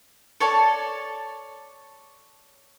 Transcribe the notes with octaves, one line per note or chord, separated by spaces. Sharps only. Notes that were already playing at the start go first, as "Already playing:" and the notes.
A4 C#5 D5 A5